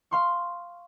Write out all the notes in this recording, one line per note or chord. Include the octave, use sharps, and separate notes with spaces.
F5 C6 C#6